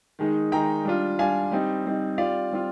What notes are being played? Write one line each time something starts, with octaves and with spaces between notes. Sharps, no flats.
D#3 G#3 D#4
D#3 G#3 D#4 G5 A#5
G3 D4 F4
G3 D4 F4 F5 G#5
G3 C4 D#4
G3 C4 D#4
G3 C4 F4 D5 F5
G3 C4 F4